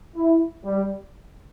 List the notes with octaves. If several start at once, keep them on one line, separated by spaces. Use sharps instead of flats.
E4
G3